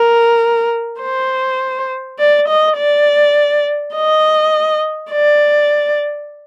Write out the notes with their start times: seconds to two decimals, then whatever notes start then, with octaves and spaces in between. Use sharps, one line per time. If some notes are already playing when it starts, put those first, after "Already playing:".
Already playing: A#4
1.02 C5
2.19 D5
2.48 D#5
2.78 D5
3.95 D#5
5.11 D5